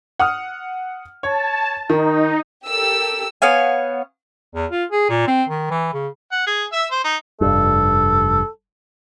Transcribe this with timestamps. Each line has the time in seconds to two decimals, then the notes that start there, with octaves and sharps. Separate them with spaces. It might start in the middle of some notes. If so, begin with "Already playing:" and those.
0.19 F#5 D#6 F6
1.23 C#5 A5
1.90 D#3 D#4
2.68 G4 A4 A#4 E6
3.42 B3 C#5 F5 G#5
4.55 E2
4.71 F4
4.92 G#4
5.09 A#2
5.27 C4
5.49 D#3
5.71 E3
5.94 C#3
6.32 F#5
6.47 G#4
6.73 E5 E6
6.91 C5
7.05 D#4
7.41 F1 G2 A4